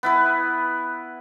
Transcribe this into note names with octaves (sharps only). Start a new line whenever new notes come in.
B3 E4 B4